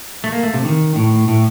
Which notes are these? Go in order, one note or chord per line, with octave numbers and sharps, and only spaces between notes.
A3
A#3
A3
C3
D#3
A2
A2